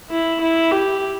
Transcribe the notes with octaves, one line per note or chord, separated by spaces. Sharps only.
E4
E4
G4